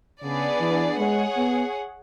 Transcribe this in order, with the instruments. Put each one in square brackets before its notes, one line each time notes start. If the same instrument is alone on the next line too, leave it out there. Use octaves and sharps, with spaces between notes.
[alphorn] C#3 [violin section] B3 D4 G#4 D5
[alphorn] E3
[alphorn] G#3 [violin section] G#4 C#5 F#5
[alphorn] B3